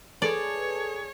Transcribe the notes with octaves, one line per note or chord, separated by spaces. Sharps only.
G#4 A4 B4 C#5 D5 A5